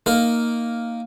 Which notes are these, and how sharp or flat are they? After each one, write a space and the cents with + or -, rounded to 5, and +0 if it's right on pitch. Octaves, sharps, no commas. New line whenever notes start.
A#3 +0 D#4 +0 A#4 +0